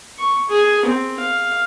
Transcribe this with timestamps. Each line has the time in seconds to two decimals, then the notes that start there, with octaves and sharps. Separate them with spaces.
0.18 C#6
0.49 G#4
0.85 C4
1.20 F5